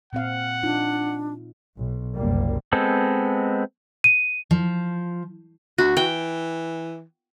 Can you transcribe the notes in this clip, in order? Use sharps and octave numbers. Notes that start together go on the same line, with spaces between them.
A#2 C4 F5 F#5
D4 D#4 F4
B1
F#1 C2 G3 A#3
G#3 B3 C4 A4
D#7
F3
D2 F#4
E3 G5